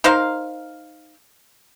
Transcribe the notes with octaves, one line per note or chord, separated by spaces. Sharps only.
D#4 A#4 C5 F5